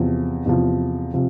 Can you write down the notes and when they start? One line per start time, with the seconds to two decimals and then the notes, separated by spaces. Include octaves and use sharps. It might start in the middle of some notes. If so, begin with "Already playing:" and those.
Already playing: E2 C3 F3
0.45 E2 C3 F3
1.14 C3 F3